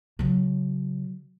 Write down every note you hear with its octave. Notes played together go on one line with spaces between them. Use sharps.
C#3 F#3